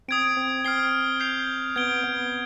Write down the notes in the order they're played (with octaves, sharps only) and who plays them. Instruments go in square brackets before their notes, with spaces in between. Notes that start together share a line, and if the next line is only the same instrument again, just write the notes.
[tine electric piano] C4 [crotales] D#6 G#6 D7
[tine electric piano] C4
[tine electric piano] C4 [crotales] F6 C7 G7
[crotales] G6 C7 F7
[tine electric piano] B3 [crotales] G#6 D7 G7
[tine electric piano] B3